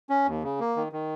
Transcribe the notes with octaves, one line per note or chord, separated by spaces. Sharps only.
C#4
D#2
C#3
A#3
D#3
D#3